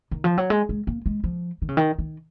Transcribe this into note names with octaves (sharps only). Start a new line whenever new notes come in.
D#3
F3
F#3
G#3
G#3
A#3
G#3
F3
D#3
C#3
D#3
D#3